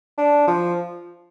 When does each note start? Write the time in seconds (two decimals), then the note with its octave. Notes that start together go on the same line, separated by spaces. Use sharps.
0.18 D4
0.47 F3